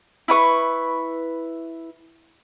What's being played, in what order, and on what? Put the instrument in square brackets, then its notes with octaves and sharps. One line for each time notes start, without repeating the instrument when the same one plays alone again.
[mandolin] E4 B4 C#6